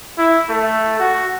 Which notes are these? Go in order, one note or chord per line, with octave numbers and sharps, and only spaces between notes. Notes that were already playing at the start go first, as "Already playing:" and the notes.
E4
A3
F#4